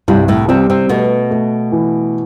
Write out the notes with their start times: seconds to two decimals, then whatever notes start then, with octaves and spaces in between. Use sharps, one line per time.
0.08 C2 G2 G3
0.28 A2 A3
0.48 C3 G3 C4
0.70 C3 C4
0.89 B2 A3 B3
1.30 A3
1.72 E3